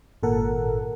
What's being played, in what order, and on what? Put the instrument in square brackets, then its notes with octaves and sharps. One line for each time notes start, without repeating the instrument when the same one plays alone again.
[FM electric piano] G#1 A#2 A4 A#4 F#5